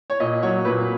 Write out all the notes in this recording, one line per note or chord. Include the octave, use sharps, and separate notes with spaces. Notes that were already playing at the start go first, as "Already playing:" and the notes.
C#5
A#2 D#5
F#3 C#5
A#2 B4